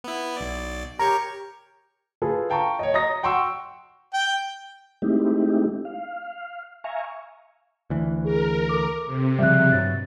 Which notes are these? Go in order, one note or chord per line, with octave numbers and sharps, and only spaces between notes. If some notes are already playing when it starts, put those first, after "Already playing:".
B3 E4
B1 D5
G4 A#4 C#5 A#5 C#6
F4 G#4 A4 B4
F5 G5 A5 A#5 C#6
C#5 D#5
D#5 A#5 D#6 A#6
F#5 G5 C6 C#6 E6
G5
G#3 A3 C4 D#4 E4 G4
F5
E5 F5 G#5 A#5 C#6
D2 E3
G#4 A#4
A4 D6
C3
C#3 F3 G3 E5 F#6
G2 B2 F#3 A6